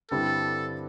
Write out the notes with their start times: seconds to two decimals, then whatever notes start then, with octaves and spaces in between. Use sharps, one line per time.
0.11 G2 D3 G3 C4 E4 A4